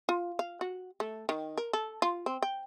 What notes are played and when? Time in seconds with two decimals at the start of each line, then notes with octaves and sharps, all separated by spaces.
0.09 F4
0.39 F5
0.61 F#4
1.00 A3
1.29 D#3
1.58 A#4
1.73 A4
2.02 F4
2.26 C4
2.42 G5